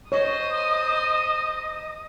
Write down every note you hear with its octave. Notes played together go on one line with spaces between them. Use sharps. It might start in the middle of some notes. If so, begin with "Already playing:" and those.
C5 C#5 D#5 D#6